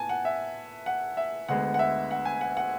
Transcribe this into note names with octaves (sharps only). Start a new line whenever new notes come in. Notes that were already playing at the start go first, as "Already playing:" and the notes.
Already playing: A2 B3 G#5 A5
F#5
E5
F#5
E5
D2 D3 G#3 B3 F#5
F#5
E5
F#5
G#5
F#5
F#5